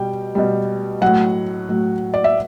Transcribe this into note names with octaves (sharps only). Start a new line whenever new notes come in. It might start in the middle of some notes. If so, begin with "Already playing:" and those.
Already playing: B2 G3 G5
B2 G3
A2 F#3 F#5
A2 F#3
D5
E5